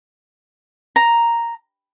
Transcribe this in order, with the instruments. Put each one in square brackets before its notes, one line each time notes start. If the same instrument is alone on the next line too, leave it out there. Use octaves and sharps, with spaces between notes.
[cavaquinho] A#5